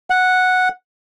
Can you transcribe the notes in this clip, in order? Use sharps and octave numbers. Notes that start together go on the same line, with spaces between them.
F#5